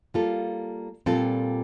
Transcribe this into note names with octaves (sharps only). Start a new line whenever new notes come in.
G3 A#3 F4 A4
A#2 G3 C4 F4 A4